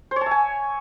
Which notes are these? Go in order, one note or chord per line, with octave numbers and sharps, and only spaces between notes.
C5
C#5
A5
E5
G#5